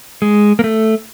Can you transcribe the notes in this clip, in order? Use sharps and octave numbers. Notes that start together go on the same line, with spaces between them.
G#3
A#3
A3